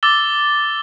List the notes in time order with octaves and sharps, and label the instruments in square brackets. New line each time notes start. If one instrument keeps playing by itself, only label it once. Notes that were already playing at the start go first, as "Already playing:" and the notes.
[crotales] D6 E6 A6 G7